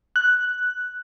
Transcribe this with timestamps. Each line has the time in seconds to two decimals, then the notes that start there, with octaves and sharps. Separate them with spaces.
0.16 F#6